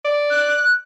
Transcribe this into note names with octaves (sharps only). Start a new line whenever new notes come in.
D5
F#6